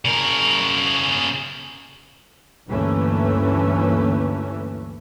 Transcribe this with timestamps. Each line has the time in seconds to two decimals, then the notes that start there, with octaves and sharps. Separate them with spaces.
0.05 C#3 A#4
2.68 D2 G2 E3 A3 A#3 C#4